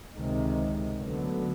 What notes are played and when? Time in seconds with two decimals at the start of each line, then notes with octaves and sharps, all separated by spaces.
0.14 C#2 C3 D#3 G#3
0.97 D2 D3 F#3 B3